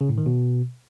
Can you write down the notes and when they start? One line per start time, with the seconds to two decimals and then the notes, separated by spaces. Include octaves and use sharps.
0.01 C#3
0.09 A2
0.18 D#3
0.26 B2